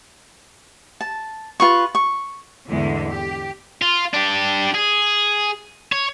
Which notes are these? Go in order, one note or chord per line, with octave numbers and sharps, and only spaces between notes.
A5
F4 B4 C#6
C#6
E2 G#2 D3 E3 G#3 A3
G4
F4
D4 G4
G#4
C#5